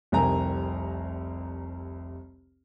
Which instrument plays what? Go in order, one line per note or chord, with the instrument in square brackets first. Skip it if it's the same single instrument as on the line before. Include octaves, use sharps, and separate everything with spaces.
[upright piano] F1 C2 C4 A#4 G#5 A#5